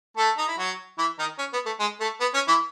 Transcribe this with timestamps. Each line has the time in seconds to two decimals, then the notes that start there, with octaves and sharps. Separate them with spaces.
0.17 A3 A4
0.38 D#4
0.48 E4
0.58 F#3 F#4
0.98 E3 E4
1.19 D#3 D#4
1.39 C#4
1.53 B3
1.66 A3
1.80 G#3
2.00 A3
2.21 B3
2.34 C#4
2.48 E3 E4